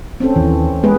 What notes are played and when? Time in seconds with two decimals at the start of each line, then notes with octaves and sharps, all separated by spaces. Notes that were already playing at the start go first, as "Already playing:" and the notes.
0.20 C4 C#4 A4
0.36 D#2 E3
0.84 G#3 A#3 B3 G#4 B4